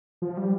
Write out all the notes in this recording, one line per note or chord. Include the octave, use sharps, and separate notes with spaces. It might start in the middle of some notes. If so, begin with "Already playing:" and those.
F3
G3